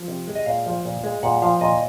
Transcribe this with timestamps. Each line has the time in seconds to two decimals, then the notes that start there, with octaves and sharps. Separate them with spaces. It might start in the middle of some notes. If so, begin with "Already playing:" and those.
Already playing: F3
0.08 C3
0.28 G#3
0.35 D#5
0.46 A#2 F5
0.66 F3
0.85 A#2
1.04 G#3
1.23 A#2 F#5
1.42 F3 F5
1.61 A#2 D#5